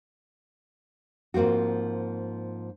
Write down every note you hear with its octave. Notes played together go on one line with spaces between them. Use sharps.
G#2 F3 A#3 C4 F#4